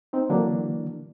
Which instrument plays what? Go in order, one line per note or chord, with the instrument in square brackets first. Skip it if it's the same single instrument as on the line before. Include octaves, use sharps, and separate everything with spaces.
[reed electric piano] C4 D#4
D3 E3 F#3 A#3 D4